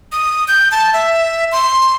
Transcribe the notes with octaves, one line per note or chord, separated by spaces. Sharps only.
D#6
G6
A5
E5
C6